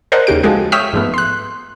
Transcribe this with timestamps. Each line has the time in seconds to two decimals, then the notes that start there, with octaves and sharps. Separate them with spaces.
0.12 A#4 C5 D5 D#5 F#5 A5
0.27 D#2 C#3 G4 D7
0.43 F3 G#3 F#4 G4 A4
0.72 C#5 E5 G5 D#6 F6 B6
0.93 G#2 F3 A3 B3
1.14 C6 F#6